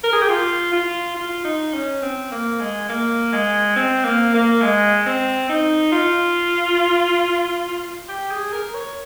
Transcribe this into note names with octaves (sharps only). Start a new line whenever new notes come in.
A#4
G#4
G4
F4
F4
F4
D#4
C#4
C4
A#3
G#3
A#3
G#3
C4
A#3
A#3
G#3
C4
D#4
F4
G4
G#4
A#4
C#5